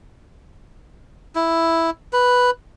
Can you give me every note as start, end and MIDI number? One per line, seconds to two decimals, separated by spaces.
1.35 1.90 64
2.13 2.51 71